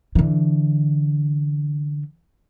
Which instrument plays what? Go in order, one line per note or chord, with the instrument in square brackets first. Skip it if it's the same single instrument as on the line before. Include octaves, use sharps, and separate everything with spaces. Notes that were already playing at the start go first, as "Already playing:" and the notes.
[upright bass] D3 E3